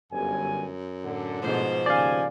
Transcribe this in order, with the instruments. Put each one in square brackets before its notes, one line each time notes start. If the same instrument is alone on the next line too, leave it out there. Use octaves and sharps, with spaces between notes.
[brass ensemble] G1 G#5 [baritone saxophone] F#2
[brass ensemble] A2 D3
[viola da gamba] G#2 B2 C5 [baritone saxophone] F3
[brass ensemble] D#2 C#3 G#5 [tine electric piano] D5 F5